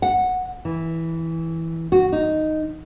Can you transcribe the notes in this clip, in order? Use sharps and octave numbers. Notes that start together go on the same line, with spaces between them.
F#5
E3
F#4
D#4